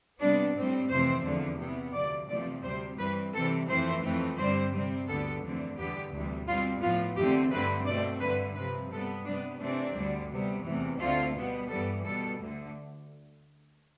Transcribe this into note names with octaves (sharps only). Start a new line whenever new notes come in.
C3 G3 B3 D4
A2 G3 C4
F2 C3 E3 A3 C4 C5
E2 D3 F3 A3
C3 E3 B3
D2 C3 F3 D5
E2 C3 F3 A3 D5
D2 C3 G3 C4 C5
G2 E3 G3 C4 B4
C3 E3 G3 C4 A4
F2 E3 A3 C4 C5
F2 E3 A3 C4
G2 D3 G3 C4 C5
C3 G3 C4
D2 D3 G3 B3 A4
E2 D3 F3 A3 C4
E2 D3 G3 B3 G4
D2 C3 E3 G3
B2 G3 C4 F4
A2 F3 B3 F4
E2 D3 A3 C4 G4
G2 D3 A3 C4 B4
B2 A3 C4 D5
G2 D3 A3 B4
C3 F3 C4 B4
C3 G3 B3 A4
C3 G3 B3 D4
C3 E3 A3 C4 D4
D2 D3 G3
C3 G3 B3
E2 C3 E3 A3
D2 D3 A3 C4 F4
B2 G3 B3
G2 E3 G3 B3 A4
B2 G3 B3 A4
D2 D3 A3